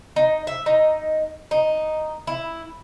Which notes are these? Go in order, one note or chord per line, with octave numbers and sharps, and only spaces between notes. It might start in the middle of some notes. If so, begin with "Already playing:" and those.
D#4
E5
D#4
D#4
E4